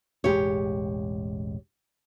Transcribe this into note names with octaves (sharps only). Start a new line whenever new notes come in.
E1 A1 G#3 G4 C#5